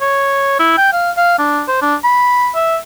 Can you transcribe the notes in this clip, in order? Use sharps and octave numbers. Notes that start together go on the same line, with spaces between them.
C#5
E4
G5
F5
F5
D4
C5
D4
B5
E5